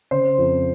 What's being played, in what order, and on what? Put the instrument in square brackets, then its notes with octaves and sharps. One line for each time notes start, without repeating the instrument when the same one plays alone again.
[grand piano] C#3 C5
F2